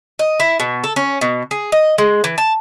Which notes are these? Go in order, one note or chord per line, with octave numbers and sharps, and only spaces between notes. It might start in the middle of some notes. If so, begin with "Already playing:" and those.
D#5
E4
B2
A4
C#4
B2
G#4
D#5
G#3
E3
A5